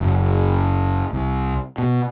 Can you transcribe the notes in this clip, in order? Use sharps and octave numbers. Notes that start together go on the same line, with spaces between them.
F#1
C2
B2